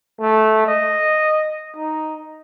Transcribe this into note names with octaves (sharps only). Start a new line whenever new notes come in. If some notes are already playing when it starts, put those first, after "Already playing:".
A3
D#5
D#4